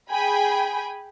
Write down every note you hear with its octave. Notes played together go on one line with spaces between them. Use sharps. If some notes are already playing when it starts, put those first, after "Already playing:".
G#4 G5 G#5 B5